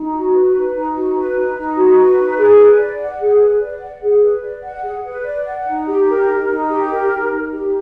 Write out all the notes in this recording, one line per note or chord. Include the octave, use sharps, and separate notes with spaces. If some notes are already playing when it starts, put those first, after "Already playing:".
Already playing: D#4
F#4
B4
D#4
D#4
F#4
B4
D#4
D#4
F#4
B4
D#4
G#4
B4
D5
F#5
G#4
B4
D5
F#5
G#4
B4
D5
F#5
G#4
B4
D5
F#5
D#4
G4
A#4
D#4
D#4
G4
A#4
D#4
D#4
G4